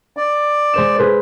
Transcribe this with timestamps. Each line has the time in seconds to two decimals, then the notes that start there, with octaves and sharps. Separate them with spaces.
0.17 D5
0.74 G#3 C5 E7
0.98 G#4 B4 C5